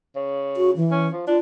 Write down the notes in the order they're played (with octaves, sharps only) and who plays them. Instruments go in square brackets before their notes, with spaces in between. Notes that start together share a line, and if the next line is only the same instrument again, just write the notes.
[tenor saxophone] C#3
[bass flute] F#4
E3
[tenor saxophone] C#4
F3
[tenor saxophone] D4 [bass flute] F4